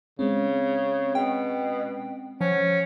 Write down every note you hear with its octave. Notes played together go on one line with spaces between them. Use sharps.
C#3 G#3 C4 C#4
B2 G5
F3 C#4 F#5